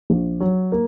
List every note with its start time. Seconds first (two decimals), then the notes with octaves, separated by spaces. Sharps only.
0.10 A#1
0.40 F#3
0.72 A#3